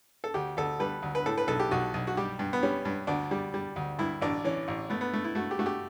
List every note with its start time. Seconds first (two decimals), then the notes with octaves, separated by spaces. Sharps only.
0.24 A4
0.34 D2 G4
0.57 D2 A4
0.80 G3 B4
1.02 D2
1.15 B4
1.26 A2 A4
1.38 B4
1.48 B1 A4
1.60 G4
1.71 B1 F#4
1.94 B1
2.07 F#4
2.17 G3 G4
2.39 G2
2.53 B3
2.63 G3 C#4
2.85 G2
3.07 D2 D4
3.31 G3
3.54 G3
3.76 D2
3.99 G2 E4
4.21 A1 D4
4.44 E3 C#4
4.68 A1
4.90 A3 B3
5.01 B3
5.13 A3
5.24 E4
5.35 A3 F#4
5.51 G4
5.59 A3 F#4
5.66 G4